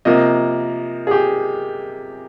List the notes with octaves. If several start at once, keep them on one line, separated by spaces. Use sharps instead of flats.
C3 F3 A#3 D#5
G#4
G4